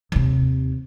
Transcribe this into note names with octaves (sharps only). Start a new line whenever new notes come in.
D#2 C3